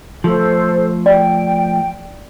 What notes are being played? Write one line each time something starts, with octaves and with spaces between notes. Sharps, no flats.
F3 A3 A4 C5
D5 G5